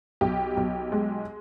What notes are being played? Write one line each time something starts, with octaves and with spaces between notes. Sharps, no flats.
B1 G4
B1
G#3